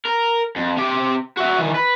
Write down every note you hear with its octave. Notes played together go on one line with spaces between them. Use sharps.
A#4
F2
C3 G4
F#4 E5
D#3 E3
B4